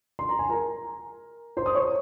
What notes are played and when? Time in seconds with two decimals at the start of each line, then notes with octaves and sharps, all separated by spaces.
0.19 C6
0.29 A#5
0.39 G#5
0.49 A#4 A#5
1.57 C5 C6
1.66 D#6
1.75 C#5 C#6